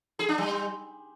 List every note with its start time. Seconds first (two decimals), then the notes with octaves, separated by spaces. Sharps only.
0.19 G#4
0.29 D4
0.38 G3